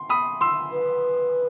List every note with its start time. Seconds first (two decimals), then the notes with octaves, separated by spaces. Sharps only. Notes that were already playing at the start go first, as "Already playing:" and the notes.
Already playing: C6
0.10 B5 D#6
0.41 C6 E6
0.72 B4